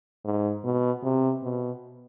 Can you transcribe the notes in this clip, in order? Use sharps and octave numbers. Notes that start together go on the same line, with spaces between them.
G#2
B2
C3
B2